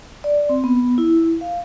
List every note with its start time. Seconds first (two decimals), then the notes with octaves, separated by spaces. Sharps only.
0.24 D5
0.49 C4
0.64 B3
0.98 E4
1.41 F5